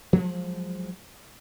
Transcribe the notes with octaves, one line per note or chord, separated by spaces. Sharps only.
F3 F#3 G#3